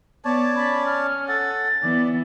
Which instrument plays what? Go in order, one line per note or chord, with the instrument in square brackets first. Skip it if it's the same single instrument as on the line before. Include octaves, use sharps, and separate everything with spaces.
[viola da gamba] B3 [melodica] C#5 D5 A5
[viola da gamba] C#4 [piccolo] B5
[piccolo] F6
[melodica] A4 F#5 [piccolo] A6
[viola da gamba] E3 B3 [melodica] D5